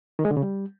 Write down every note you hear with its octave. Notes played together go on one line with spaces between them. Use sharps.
D#3
G#3
D3
C#3
G3